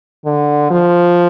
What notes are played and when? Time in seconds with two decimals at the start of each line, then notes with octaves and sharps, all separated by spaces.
0.25 D3
0.70 F3